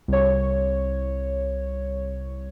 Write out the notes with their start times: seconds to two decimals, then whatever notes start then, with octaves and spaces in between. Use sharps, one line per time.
0.08 C2 C#5